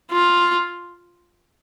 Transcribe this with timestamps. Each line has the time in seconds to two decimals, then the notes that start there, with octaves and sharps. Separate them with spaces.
0.12 F4